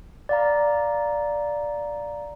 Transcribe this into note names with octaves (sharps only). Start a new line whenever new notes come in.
D5 F5 A#5